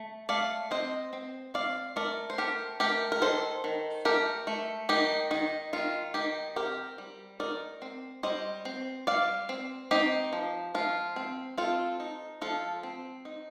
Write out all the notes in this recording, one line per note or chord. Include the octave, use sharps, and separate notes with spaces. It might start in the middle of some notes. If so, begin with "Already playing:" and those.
Already playing: A3
A3 D5 F5
C4 C5 D#5
C4
C4 D5 F5
A3 A#4 D5
C5
A3 G4 A#4
A3 G4 A#4
A#4
D#3 A4 C5
D#3
A3 G4 A#4
A3
D#3 D#4 G4
D#3 D#4
D#3 F4
D#3 D#4 G4
C4 G4 A#4
G3
D#4 A#4 D5
C4
G3 C5 D#5
C4
G3 D5 F5
C4
C4 D#4 G4
F3
F3 F4
C4
C4 F4 A4
D#4
F3 F4 A4
C4
D#4